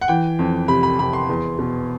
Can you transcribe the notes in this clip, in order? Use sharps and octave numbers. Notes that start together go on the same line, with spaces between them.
F#5
E3 G5
F2
C3 B5
B5
C3 B5
C6
E2
B2